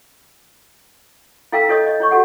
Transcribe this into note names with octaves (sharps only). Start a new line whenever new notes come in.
E4 A4 F5 G5 A#5 E6
E4 A4 C#5 D#5 D#6
C#5 D#5
E4 C#5 C#6
F#4 G4 A4 F#5